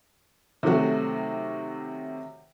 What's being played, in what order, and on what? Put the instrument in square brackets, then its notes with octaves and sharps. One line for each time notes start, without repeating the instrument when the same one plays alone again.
[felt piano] C3 D#3 F#3 A3 F#4